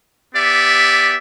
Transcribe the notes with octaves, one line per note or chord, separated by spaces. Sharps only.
B3 G4 D5 E5